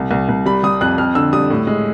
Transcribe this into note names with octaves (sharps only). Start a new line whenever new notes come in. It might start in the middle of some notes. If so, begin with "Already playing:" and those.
Already playing: C2
C2
C2
G3 B5
G3 D#6
F2 F#6
F2 F6
D3 E6
G3 D#6
A2
G#3